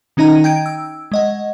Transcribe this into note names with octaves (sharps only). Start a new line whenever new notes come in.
D#3 C#4 D#4 D#5 A#5
G5 G6 G#6 D7
E6
G#3 D#5 F#5